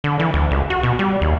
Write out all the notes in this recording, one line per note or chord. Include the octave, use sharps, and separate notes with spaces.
D3
E3
D2
C#2
F#4
B2
G3
D#2